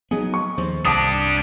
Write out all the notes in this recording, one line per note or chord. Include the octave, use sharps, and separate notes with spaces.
F#3 B3 D#4 G#4
C#6
D#2 F3 C5
C2 D4 G4 A5 D6 D#6